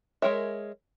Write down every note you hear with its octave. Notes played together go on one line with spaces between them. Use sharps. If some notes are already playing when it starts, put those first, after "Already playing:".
G#3 A#4 C#5 E5